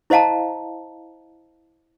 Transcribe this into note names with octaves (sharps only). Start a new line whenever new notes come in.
E4 C5 D#5 F5 A5 A#5